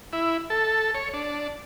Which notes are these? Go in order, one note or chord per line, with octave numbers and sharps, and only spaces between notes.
E4
A4
C#5
D4